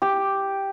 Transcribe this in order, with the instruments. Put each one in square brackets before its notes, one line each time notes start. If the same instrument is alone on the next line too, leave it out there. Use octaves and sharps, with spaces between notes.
[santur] G4